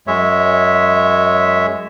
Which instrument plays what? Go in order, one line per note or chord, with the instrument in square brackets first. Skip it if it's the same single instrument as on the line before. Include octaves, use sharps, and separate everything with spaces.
[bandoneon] F#2 G#3 C#5 E5